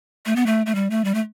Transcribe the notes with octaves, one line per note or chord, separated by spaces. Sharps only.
A3
B3
A3
A3
G3
A3
G3
A3